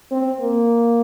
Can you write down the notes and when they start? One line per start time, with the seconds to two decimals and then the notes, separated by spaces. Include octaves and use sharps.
0.11 C4
0.40 A#3